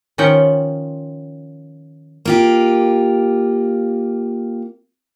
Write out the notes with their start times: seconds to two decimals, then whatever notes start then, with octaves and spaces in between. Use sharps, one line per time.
0.18 D#3 F3 C#4 F4 F#5 G5
2.25 A#3 F4 G4